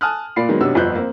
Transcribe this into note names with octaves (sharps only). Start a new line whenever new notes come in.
G#5 A5 D#6 F6 F#6
A#2 F4 D5 B5 C7
D#3 F#3 G#3 B3
B1 C3 D4 C#5 E6
G1 F2 F3 F#6 G6
A#3 C4